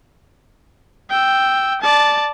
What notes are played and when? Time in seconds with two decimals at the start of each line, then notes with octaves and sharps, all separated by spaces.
1.10 G5 E6
1.82 D5 A5